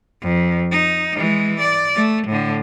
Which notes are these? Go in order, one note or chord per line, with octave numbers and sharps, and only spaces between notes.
F2
D#4
E3 G#3
D5
A3
A2 D3